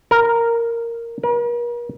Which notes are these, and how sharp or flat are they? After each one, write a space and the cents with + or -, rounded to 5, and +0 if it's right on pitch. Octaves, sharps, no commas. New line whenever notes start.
A#4 -5
A#4 +45